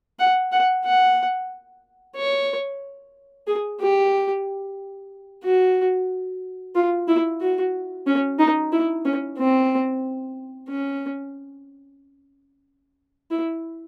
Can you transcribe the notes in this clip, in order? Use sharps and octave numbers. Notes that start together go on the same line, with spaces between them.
F#5
F#5
F#5
C#5
G#4
G4
F#4
F4
E4
F#4
C#4
D#4
E4
C#4
C4
C#4
E4